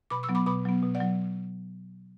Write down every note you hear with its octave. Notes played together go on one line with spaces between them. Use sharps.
B2 B5 D6
C#6 E6
F#3 B3
B5 D6
B2 B5 D6
F#3 B3
B2
D5 F#5
F#3